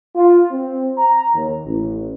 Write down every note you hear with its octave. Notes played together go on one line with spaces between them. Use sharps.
F4
C4
A#5
D#2
A1